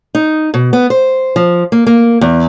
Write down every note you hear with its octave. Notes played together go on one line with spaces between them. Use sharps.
D#4
B2
B3
C5
F3
A#3
A#3
E2